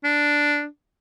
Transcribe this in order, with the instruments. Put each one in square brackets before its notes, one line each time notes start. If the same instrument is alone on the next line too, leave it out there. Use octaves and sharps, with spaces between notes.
[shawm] D4